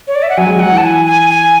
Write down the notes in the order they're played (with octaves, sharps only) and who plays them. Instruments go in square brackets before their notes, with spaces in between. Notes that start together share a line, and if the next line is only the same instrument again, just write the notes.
[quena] C#5
D5
E5
F#5
[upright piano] F#3 [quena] G#5
[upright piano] G#3
[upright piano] F#3 [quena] F#5
[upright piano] E3
[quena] A5
G#5
G#5
G#5